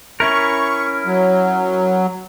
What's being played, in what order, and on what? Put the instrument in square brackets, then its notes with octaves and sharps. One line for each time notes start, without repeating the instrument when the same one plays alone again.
[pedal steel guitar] C#4 E4 A#4 [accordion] C#6
[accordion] F#3